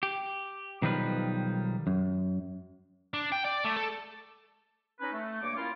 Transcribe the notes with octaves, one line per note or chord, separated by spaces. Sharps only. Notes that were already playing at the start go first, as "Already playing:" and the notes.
G4
B1 D#3 F3 G3 B4
F#2
D4
G5
D5
A3
A4
C#4 D#4 B4
A3
G2 A#3 C#5 D6
A#3 C#4 E4 F4